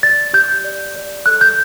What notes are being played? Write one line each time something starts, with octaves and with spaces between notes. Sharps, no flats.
D5 A6
G4 G6
D5
D5
A4 F#6
G6